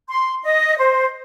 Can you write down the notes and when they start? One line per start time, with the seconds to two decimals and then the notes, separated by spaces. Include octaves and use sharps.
0.08 C6
0.44 D#5
0.78 C5